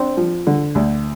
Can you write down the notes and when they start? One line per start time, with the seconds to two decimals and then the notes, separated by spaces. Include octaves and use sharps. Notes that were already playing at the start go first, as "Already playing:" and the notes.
Already playing: C4 D4
0.17 F3
0.47 D3
0.75 D2